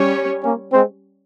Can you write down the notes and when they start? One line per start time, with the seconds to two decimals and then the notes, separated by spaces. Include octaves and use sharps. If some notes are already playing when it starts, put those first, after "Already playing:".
Already playing: G3 C#4 C#5
0.43 A#3 C#4
0.72 G#3 C4